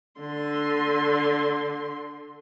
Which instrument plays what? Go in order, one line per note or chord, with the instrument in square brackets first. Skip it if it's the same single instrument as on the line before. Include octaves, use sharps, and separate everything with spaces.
[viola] D3 C6